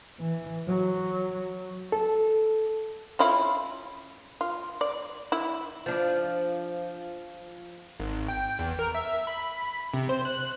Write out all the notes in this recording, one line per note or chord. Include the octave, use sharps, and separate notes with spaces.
E3
F#3
A4
C#4 E4 F4
F4
D5
E4
F3 D4
G#1
G5
E2
A#4
E5
B5
C3
C5
F#6